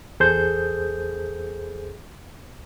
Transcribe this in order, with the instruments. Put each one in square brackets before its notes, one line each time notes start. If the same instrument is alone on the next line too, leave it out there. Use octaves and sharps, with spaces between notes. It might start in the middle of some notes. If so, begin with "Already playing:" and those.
[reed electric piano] E2 G#4 A4 C5 G6